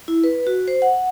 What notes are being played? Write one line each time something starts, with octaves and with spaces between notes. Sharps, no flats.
E4
B4
F#4
C5
F#5